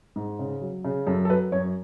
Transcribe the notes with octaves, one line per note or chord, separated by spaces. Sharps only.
G#2
C#3
F#3
C#3
F#2 A4
A4
F#3 B4
F#2 C#5